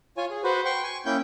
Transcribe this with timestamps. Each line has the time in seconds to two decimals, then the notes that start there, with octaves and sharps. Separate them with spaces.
0.17 F4 C#5 G#5
0.30 G#4
0.44 F#4 B4 C5
0.65 G5 C6 C#6
0.83 G#5 C#6
1.06 A#3 C#4 E4 G5 G6